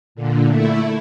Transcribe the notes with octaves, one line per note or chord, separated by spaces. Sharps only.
A#2 D3
A3 E4